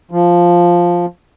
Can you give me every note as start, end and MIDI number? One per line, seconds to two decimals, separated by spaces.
0.11 1.06 53